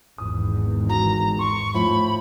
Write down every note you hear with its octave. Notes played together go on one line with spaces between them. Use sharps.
G#1 E2 D#6
F#4 A#5
C6 C#6
A2 F3 B5